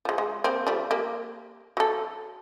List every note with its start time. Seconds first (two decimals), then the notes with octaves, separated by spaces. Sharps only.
0.05 F3 G#3
0.18 G#3
0.44 A#3 C4
0.67 F3 G3 A3
0.91 A#3 G4
1.77 F#3 A4